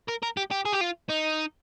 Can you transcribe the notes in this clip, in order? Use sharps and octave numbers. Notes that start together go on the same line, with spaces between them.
A#4
A#4
G4
G4
G#4
G4
F4
D#4